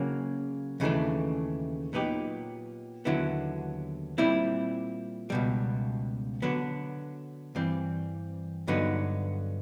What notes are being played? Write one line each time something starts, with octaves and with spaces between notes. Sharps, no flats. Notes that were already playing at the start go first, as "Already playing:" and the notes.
Already playing: C#3 F#3 A#3
D#2 C#3 E3 A3 D4
A#2 F#3 B3 D#4 G4
D#2 D3 F#3 B3 E4
A#2 G3 C4 E4
C#2 B2 G3
D3 F#3 B3 D4
G2 E3 G3 C4
G2 D3 F#3 B3 D#4